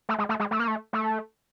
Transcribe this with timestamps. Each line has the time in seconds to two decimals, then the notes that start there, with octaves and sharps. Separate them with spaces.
0.09 A3
0.18 G#3
0.29 A3
0.39 G#3
0.51 A3
0.59 A#3
0.68 A3
0.93 A3